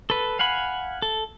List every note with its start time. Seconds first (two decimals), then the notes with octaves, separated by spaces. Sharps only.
0.10 A4 B4
0.39 F5 F#5 G#5 B5
1.02 A4